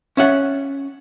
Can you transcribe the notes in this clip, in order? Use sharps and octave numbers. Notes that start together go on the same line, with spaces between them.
C#4 E5 F#5